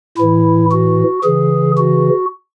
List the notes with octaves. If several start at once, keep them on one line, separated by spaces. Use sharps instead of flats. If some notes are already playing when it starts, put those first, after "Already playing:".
A2 E3 E4
F#4
C#3 E3 G#4
F#4